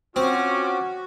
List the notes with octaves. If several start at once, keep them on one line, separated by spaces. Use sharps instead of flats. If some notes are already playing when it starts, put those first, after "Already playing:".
C4 C#4 F4 F#4 D6